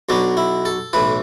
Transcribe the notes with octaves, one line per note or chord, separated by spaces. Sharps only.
B1 B2 F#3 D4
E4
A4
B1 A2 E3 B4